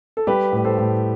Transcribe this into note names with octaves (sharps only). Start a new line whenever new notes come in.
A4
G3 G4 B4
A2
B4
A4 C5
A2